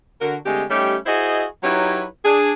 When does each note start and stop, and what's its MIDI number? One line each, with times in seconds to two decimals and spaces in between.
0.21 0.36 50
0.21 0.36 66
0.21 0.36 70
0.45 0.63 50
0.45 0.63 56
0.45 0.63 57
0.45 0.63 60
0.45 0.63 67
0.45 0.63 75
0.69 0.96 55
0.69 0.96 57
0.69 0.96 61
0.69 0.96 63
0.69 0.96 67
1.06 1.44 64
1.06 1.44 66
1.06 1.44 68
1.06 1.44 72
1.06 1.44 75
1.63 2.05 54
1.63 2.05 63
1.63 2.05 64
1.63 2.05 67
1.63 2.05 71
1.63 2.05 73
2.24 2.52 62
2.24 2.52 68